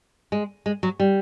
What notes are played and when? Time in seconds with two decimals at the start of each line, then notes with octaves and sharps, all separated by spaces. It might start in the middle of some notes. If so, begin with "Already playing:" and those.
0.32 G#3
0.66 G#3
0.83 F#3
1.00 G3